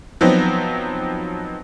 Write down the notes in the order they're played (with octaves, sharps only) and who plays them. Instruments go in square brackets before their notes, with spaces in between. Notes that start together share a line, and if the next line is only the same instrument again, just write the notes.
[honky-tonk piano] F3 F#3 B3 C4 D#4